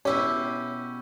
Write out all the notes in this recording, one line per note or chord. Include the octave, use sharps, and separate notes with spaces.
B2 C#4 E4 G4